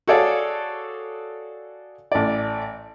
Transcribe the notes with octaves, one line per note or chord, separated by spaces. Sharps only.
F#4 G#4 A4 C#5 D5 F5
A1 D5